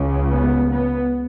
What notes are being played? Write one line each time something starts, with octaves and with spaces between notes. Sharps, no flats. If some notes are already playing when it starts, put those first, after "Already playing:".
Already playing: C#2 C#3
B3
B3